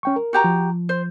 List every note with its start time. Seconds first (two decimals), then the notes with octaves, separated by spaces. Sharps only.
0.03 C#4 G5 C#6
0.16 A#4
0.33 F#4 G4 A#5
0.44 F3
0.89 C5